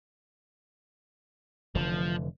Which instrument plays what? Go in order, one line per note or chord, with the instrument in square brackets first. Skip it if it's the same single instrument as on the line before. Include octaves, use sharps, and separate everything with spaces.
[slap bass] F1 D3 E3 [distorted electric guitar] F3